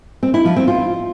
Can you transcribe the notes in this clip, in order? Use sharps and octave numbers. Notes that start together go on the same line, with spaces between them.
C4
E4
F3
C4
F4